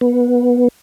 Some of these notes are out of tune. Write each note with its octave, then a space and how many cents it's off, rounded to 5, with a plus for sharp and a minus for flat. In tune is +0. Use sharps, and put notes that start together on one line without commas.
B3 -15